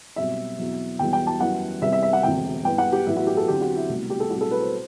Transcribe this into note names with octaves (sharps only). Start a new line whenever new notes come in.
B1 B2 G3 C4 E5
E2 B2 F#3 C4
E1 E2 B2 G3 G5
G5
A5
F#2 E3 G3 B3 F#5
C2 C3 G3 B3 E5
E5
E5
F#5
E1 D2 C3 G5
G2 E3 B3 G5
F#5
G4
A1 A2 F#3 B3 E4
F#4
G4
A4
E2 D3 F#3 C4 G4
F#4
E4
C2 B2 A3
G4
A4
B1 A2 G3 C4 F#4
A4
B4
C5